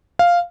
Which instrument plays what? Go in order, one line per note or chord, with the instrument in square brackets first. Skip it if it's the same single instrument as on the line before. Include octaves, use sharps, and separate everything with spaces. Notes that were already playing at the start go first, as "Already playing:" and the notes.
[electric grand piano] F5